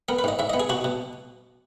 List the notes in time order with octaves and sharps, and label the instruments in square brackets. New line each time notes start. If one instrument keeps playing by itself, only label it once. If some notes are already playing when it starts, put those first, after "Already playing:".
[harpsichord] B3 A#4
B4
G#2 D#5
G#2 E5
D#5
B3
G#4
B2 F#4
B2